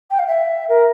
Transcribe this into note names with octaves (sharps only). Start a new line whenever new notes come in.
G5
F5
E5
A#4